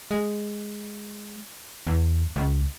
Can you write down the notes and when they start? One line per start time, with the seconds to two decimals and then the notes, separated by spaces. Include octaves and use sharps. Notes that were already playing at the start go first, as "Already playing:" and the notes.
0.11 G#3
1.87 E2
2.36 C#2